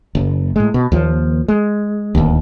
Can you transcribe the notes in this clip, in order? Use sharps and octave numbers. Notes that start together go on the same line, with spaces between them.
F#1
A2 G#3
B2
D#2 F3
G#3
D1 D#2